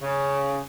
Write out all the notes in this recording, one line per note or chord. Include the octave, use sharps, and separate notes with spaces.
C#3